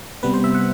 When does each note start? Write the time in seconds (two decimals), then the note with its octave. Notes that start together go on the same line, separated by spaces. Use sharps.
0.23 C3 G3 B3 B4
0.34 C5
0.44 E5
0.55 F#5